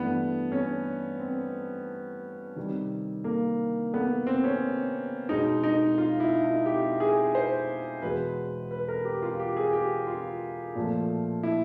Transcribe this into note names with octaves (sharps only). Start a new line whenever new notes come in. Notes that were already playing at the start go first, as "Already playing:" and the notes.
Already playing: G2 E3 A3 B3
C#4
C4
C3 D#3 G3
A#3
B3
C4
C#4
B2 G#3 D#4
D#4
F4
E4
D#4
G4
G#4
C5
E2 B2 G#3 B4
B4
A#4
G4
F4
G4
G#4
G4
F4
A#2 F3 A3
E4